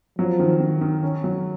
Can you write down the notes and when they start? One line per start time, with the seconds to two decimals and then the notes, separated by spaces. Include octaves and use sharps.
0.19 F3 F#3
0.39 D#3
0.60 D#3
0.81 D#3
1.03 C#4
1.24 F#3